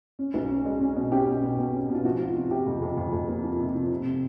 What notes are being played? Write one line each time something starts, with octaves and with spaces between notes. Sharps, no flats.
C#4
B1
C#4
G#3
C#4
B2
C#4 G4
B2
B2
B2
C#4
B2
F4
F3 F#4
F3 F4
C3 F4
C3 G4
F2
F2
F2
F2
A#3
F3
C3
F3
C3
C3